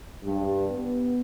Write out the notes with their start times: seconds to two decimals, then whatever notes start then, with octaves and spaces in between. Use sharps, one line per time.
0.23 G2
0.71 B3